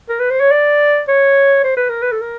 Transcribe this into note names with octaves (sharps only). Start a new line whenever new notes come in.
A#4
B4
C5
C#5
D5
C#5
C5
B4
A#4
B4
A4
A#4